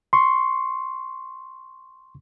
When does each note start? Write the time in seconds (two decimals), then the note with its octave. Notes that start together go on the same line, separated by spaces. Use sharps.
0.13 C6 C#6